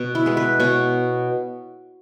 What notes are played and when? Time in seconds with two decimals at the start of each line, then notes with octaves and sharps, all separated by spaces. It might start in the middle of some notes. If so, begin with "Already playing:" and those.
Already playing: B2
0.15 E4
0.26 G#3 B3
0.37 B4
0.60 B2 C#5